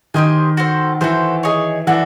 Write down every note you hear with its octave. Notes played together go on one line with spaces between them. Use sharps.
D#3 G4 C5 D#5 G#5
F#4 A4 C5
E3 F#4 A4 C5
D#4 G#4 C#5
E3 D4 F#4 A4